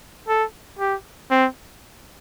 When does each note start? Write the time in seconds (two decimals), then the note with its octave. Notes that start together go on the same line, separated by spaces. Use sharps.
0.28 A4
0.79 G4
1.31 C4